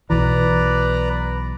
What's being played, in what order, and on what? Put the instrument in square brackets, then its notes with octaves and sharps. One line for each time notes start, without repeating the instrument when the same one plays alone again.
[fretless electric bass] B1 E2 E3 [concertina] B4 D5 A#5